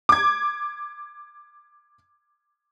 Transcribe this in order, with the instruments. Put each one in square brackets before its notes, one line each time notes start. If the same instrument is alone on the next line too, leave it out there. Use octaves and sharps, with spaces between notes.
[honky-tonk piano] D6 G#6